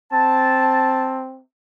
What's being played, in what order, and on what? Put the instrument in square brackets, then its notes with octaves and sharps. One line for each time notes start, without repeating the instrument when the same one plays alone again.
[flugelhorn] C4 [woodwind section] A5